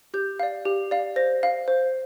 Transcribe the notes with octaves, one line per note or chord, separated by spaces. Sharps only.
G4 G6
D5 F5
G4
D5 F5
C5 A#6
F5
C5